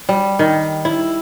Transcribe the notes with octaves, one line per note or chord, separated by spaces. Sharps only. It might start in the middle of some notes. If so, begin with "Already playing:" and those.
G3
D#3
E4